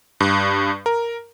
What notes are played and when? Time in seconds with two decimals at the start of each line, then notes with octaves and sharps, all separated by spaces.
0.20 G2
0.86 A#4